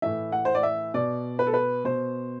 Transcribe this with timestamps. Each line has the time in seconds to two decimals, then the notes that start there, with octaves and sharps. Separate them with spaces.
0.02 A2 E3 E5
0.32 F#5
0.45 C5
0.55 D5
0.63 E5
0.94 B2 D5
1.39 B4
1.47 A4
1.54 B4
1.85 B2 C5